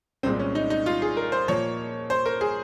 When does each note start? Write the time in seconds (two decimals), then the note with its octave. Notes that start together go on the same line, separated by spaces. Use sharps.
0.23 C2 A#2 G#3 C4
0.39 C#4
0.55 D#4
0.70 D#4
0.86 F4
1.02 G#4
1.17 A#4
1.32 C5
1.48 A#2 F3 A#3 C#5
2.10 C5
2.26 A#4
2.41 G#4